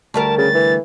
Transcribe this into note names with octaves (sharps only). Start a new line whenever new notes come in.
D2 G3 A#4 A5
C#3 A6
E3